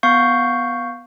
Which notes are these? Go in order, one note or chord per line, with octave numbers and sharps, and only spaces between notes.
B3 F5 C#6 G6